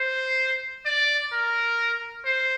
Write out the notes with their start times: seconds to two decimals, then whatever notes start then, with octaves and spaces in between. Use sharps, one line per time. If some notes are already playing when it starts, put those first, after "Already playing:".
Already playing: C5
0.85 D5
1.32 A#4
2.25 C5